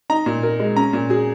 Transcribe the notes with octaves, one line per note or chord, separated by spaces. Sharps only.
D#4 A#5
A#2
A#4
G#3
C#4 A#5
A#2
G#4